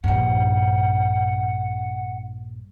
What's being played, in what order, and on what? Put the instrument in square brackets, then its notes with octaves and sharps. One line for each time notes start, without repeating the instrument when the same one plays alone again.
[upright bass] A#1 G2 [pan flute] F#5